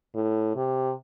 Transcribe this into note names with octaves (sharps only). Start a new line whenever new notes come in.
A2
C3